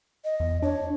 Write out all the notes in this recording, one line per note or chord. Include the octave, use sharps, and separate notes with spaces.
D#5
E2
D4 C#5